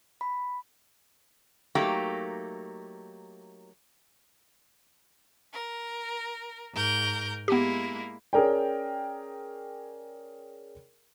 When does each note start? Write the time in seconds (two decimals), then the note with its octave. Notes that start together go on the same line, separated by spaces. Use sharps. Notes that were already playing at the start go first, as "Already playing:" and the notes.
0.21 B5
1.75 F#3 A3 A#3 D#4 G4
5.53 A#4
6.73 G#2 A#4 G6
7.48 G#3 A#3 B3 E4 G4
8.33 C#4 G#4 A#4 D5 G5